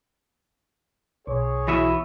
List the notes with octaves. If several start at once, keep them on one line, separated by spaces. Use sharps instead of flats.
B1 G#4 C#5
E3 B3 E4 F#4 E5